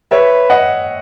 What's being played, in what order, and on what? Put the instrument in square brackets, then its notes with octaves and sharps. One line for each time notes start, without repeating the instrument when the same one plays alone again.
[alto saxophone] B4 [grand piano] C#5 E5
[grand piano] D#5 F#5